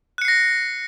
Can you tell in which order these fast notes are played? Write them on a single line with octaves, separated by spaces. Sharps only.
F#6 C#7 C7 A#6